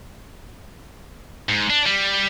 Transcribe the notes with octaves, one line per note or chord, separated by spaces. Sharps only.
G#2
D4
G3